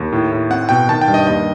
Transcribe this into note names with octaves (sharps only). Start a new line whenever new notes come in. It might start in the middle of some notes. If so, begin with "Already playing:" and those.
Already playing: D#2
A2
A2
C4 F#5
B2 G5
D#3 A5
G5
G2
D#5
D#2 D#5